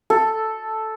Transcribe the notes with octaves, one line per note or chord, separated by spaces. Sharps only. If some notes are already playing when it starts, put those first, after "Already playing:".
A4